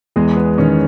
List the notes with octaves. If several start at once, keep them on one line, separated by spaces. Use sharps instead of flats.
E2 G#3 G#4
B3 B4
D#3 C#4 C#5